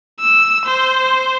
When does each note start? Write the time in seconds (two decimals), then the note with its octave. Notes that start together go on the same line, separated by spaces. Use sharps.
0.20 E6
0.66 C5